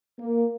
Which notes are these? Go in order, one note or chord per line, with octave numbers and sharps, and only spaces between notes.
A#3